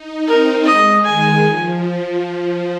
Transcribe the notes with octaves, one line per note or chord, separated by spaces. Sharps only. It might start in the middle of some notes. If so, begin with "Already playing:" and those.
Already playing: D#4
C4 A#4
G#3 D#5
D#3 G#5
F3